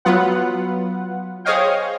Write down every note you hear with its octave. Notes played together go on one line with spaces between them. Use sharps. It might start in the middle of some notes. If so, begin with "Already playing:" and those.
F#3 B3 F4 B4 F#5
G#4 C5 C#5 D#5 F5 G5